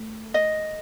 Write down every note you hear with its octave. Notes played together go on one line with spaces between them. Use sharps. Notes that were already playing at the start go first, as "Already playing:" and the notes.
Already playing: A3
D#5